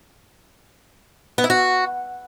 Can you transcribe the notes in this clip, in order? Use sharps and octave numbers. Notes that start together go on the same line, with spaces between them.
B3
E4
F#4